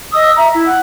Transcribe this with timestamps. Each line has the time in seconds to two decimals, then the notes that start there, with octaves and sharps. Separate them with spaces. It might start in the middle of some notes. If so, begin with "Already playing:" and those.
0.12 D#5 D#6 E6
0.36 E5 A#5
0.52 E4
0.66 F#5